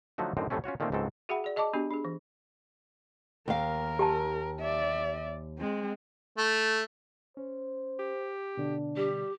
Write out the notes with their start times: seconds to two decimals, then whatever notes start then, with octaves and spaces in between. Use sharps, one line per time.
0.18 D3 F3 F#3 A3 D#4 F#4
0.37 F#2 A2 D3 D#3 C4 D#4
0.50 E2 A2 G3 A3 C4 C#4
0.64 C#4 F4 F#4 C#5
0.80 A#2 D#3 A3 A#3 C4 C#4
0.92 C#2 G#2 C#3 F#3 C4 A4
1.29 F#4 G#4 E5 F#5 G5 B5
1.44 G#4 D5
1.56 G#4 D#5 A5 C#6 D6
1.73 B3 D4 F#4 G4
1.91 D4 G#4
2.05 E3
3.48 D#2 A#4 F5
3.99 G4 G#5 A5
4.60 D5 E5
5.59 G#3 C4
6.38 A3
7.37 C#4 C5
7.99 G4
8.57 B2 D3 D4
8.97 G3 G4